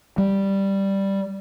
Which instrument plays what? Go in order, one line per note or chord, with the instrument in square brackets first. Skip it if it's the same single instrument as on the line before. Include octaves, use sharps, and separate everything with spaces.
[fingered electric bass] G3